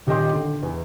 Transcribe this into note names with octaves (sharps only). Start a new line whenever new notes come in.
D#1 G4 D#5 G5 C6
D3
E2